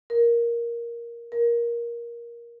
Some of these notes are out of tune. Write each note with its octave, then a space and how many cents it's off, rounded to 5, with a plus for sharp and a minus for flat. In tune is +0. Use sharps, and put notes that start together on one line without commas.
A#4 +10
A#4 +15